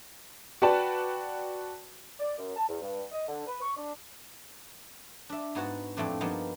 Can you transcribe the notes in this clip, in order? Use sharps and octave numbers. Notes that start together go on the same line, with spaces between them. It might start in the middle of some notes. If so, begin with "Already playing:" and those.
F#4 B4 D5 G5 A5
D5
F#2
A5
E2
G2
D#5
D3
B4
C#6
D4
D4 E5
G#2 B3 F#4 F#5 A5
F2 A2 A3 C4 D4
G2 F3 A#3 B3 D#4 A5